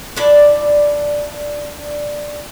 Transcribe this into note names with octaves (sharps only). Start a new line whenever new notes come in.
D4 E4 D5